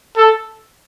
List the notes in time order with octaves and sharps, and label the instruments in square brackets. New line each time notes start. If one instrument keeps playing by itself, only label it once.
[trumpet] A4